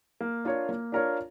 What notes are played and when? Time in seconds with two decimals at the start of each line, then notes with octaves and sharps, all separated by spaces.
0.21 A#3
0.45 D4 F4 A#4 C#5
0.69 A#3
0.92 D4 F4 A#4 C#5